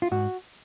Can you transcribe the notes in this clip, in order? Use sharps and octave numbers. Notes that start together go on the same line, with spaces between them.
F4
G#2 F#4